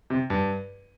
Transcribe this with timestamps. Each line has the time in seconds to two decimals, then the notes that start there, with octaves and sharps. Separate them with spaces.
0.10 C3
0.30 G2